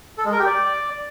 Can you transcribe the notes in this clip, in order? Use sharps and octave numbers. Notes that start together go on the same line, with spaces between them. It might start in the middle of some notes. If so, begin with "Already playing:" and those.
A4
G#3
A#4
G4
D5